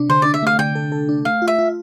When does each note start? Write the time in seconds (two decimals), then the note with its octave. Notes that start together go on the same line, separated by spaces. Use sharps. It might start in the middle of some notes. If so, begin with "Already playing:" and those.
Already playing: C3 D4
0.09 D3 C5
0.22 D4 D5
0.34 E5
0.43 A3 F5
0.59 D3 G5
0.75 A4
0.92 A4
1.09 D4
1.25 A3 F5
1.42 F4
1.47 E5
1.59 F4